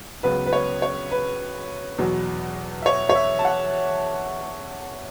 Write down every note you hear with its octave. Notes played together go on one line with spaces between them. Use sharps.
C#2 C#3 F#3 B3 B4
B4
C#5
C#5
B4
E2 B2 F#3
E5
C#5
C#5
E5
A5
F#5